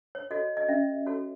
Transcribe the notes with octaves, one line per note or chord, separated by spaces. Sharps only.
C#5
F#4 A4 C#5 D#5
D#5
C#4 E5
F#4 A4 C#5